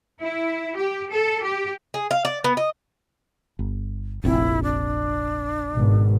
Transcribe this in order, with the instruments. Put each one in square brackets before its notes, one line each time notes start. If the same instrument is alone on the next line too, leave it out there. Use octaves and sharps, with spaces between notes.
[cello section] E4
G4
A4
G4
[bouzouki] G#4
F5
D5
B3
D#5
[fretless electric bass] G1
[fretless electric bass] F1 A#1 C4 [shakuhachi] E4
[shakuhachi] D4
[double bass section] G#1 B2